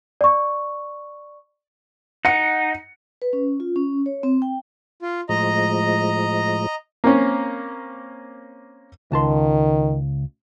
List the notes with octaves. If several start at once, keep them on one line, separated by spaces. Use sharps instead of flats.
D5 C#6
D#4 F#5 C#7
B4
C#4
F4
C#4
C#5
C4
G5
F4
A2 F3 G#3 D#5 A#5
A#3 C4 C#4
C#2 D#3 A5 C6